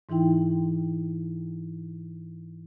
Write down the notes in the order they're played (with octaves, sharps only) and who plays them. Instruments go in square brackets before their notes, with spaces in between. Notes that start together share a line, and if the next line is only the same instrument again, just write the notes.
[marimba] G#2 E3 D#4 E4 G5